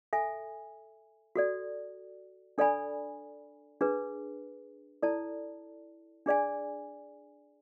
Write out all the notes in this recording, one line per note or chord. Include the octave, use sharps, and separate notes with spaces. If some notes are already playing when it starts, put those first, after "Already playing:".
A4 E5 G#5
F#4 A4 D5
D4 A4 D5 G#5 B5
D4 G#4 B4
E4 A4 D5 A5
D4 G#4 D5 G#5